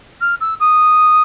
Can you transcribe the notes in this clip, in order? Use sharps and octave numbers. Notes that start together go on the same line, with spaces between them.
F6
E6
D#6